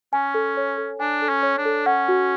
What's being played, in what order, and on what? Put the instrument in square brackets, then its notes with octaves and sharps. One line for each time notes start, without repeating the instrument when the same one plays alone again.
[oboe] C#4 [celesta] G#5
[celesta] A4
C#5
A4
[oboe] D4 [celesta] G#5
[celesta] A4
[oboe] C#4
[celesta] C#5
[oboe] D4
[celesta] A4
[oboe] C#4 [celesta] F#5
[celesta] F#4